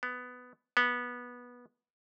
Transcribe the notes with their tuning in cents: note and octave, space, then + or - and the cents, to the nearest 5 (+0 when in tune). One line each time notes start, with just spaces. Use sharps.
B3 +10
B3 -15